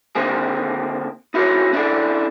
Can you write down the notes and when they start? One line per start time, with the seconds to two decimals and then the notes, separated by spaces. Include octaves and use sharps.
0.15 D3 D#3 A#3 C4 G#4
1.34 D#4 E4 F#4 G#4 A#4 C#5
1.73 C#4 D4 E4 A4 D5